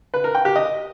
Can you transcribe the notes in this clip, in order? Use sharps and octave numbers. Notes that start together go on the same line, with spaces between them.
B4
A#4
G5
G4
D#5